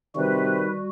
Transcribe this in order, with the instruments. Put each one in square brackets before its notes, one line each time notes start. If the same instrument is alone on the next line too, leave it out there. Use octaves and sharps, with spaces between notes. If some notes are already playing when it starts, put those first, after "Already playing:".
[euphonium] C3 [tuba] D#3 [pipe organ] G3 F#4 [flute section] B4